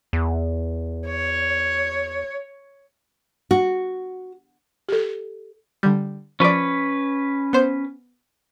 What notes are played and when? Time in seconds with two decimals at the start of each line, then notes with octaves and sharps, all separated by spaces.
0.13 E2
1.07 C#5
3.51 F#4
4.89 G4 A4
5.83 D3 G3
6.40 F3 C#4 B4 D5
7.53 B3 C5